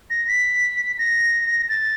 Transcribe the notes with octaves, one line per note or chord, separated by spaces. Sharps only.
A#6
B6
A#6
A6